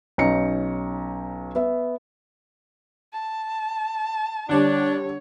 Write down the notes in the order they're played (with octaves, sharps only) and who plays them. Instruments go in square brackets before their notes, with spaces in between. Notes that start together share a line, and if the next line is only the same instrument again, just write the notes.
[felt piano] B1 C#4 D#4 D#5 A#5 C#7
B3 E5
[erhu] A5
[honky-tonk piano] D3 G3 [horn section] D4 [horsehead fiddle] C#5